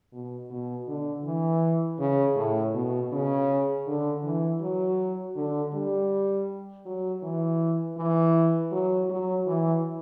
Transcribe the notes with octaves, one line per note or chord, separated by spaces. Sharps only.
B2
B2
D3
E3
C#3
A2
B2
C#3
D3
E3
F#3
D3
G3
F#3
E3
E3
F#3
F#3
E3